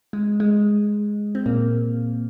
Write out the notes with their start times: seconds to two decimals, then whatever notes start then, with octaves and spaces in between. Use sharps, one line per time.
0.13 G#3
0.40 G#3
1.35 C4
1.46 A#2 A#3